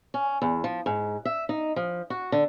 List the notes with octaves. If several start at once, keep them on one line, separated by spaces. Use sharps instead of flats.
C#4
E2
F3
G#2
E5
D#4
F3
F#4
D3